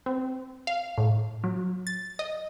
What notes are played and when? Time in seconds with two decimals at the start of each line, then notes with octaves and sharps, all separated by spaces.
0.06 C4
0.67 F5
0.98 A2
1.44 F#3
1.87 A6
2.19 D#5